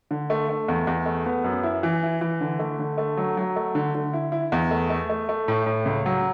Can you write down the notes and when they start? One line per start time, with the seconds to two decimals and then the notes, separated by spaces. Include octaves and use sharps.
0.11 D3
0.30 A3
0.49 A3
0.68 E2
0.87 E2
1.06 A3
1.26 B3
1.44 F#2
1.63 E4
1.83 E3
2.03 E4
2.21 E3
2.41 D3
2.59 A3
2.79 D3
2.98 A3
3.17 F#3
3.37 F#3
3.56 A3
3.75 D3
3.95 D3
4.13 E4
4.32 E4
4.52 E2
4.71 A3
4.90 A3
5.09 A3
5.29 A3
5.48 A2
5.66 A2
5.85 C#2
6.06 F#3